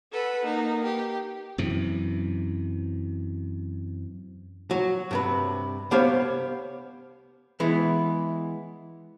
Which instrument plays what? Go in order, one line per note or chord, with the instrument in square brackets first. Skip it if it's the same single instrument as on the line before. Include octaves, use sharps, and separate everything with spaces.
[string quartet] A4 B4 F#5
A#3 D#4
G4
[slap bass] F#2 C3 E3
[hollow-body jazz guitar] F#3 F#4
G2 C3 B4
C2 B3 G4 C5 C#5 F5
E3 G#3 B3 E4